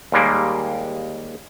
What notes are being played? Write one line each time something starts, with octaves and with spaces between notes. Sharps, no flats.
D#2 G3 G#3 A#3